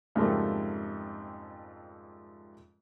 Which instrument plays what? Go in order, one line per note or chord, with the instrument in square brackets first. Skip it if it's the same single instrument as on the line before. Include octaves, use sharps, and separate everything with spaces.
[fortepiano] F2 G#2 C#3 G3 A3 A#3